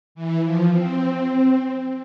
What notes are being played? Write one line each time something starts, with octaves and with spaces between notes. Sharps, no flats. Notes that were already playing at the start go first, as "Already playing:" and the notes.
E3
F3
C4